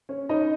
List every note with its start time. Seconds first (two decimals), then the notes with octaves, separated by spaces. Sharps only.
0.09 C#4
0.29 C#4 D#4 D#5